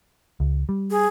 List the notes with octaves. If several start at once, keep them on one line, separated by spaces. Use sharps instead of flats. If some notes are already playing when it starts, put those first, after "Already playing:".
C#2
G3
G#4